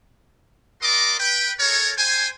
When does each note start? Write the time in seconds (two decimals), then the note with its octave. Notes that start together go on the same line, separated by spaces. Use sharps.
0.81 F#4 A#4 D5 D#5 C6 D6
1.18 B4 G5
1.60 A4 A#4 C#5
1.96 C5 G5 G#5